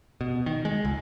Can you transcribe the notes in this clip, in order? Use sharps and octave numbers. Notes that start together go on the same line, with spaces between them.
B2
D#3
G#3
C#2